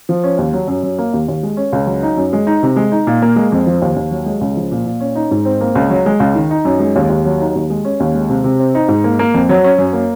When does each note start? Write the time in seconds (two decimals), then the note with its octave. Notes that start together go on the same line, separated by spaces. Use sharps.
0.09 F3
0.24 C#4
0.38 D#2
0.53 F#3
0.67 F#2
0.83 F#2
0.98 A#3
1.13 D#2
1.28 D#2
1.43 G#3
1.57 C#4
1.73 C#2
1.87 F#3
2.03 D#4
2.17 F#2
2.33 G#3
2.47 D#4
2.63 C3
2.76 G#3
2.92 D#4
3.07 A#2
3.22 A#3
3.36 G#3
3.52 F2
3.67 F3
3.82 D#2
3.96 D#2
4.11 F#3
4.26 G#3
4.41 C#2
4.57 F3
4.71 A#2
4.86 A#2
5.00 C#4
5.16 D#4
5.31 G#2
5.45 C4
5.61 A#3
5.75 C#2
5.90 F#3
6.06 G#3
6.20 C#2
6.35 D#3
6.51 D#4
6.65 F#2
6.80 G#3
6.96 D#2
7.10 D#2
7.25 F#3
7.40 D#4
7.55 D#2
7.70 G#3
7.85 C#4
8.00 D#2
8.14 G#3
8.29 C3
8.44 C3
8.59 C4
8.75 D#4
8.88 G#2
9.04 A#3
9.19 A#3
9.34 F2
9.49 F#3
9.64 C#4
9.78 F#2
9.93 A#3